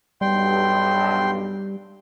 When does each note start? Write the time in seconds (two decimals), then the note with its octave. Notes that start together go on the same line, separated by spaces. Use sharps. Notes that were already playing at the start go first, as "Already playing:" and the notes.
0.21 B1 G2 G3 G5 C6